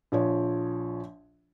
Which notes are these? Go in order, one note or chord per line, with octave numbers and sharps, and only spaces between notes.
A#1 F3 C#5